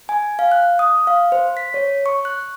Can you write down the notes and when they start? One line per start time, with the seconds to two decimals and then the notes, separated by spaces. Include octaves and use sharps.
0.09 G#5
0.39 F5
0.52 F#6
0.79 D#6
1.07 F5
1.32 C5
1.57 B6
1.74 C#5
2.06 C#6
2.25 F#6